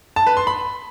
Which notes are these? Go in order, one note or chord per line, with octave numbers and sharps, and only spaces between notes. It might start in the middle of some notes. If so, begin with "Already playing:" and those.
A5
B4
C6
B5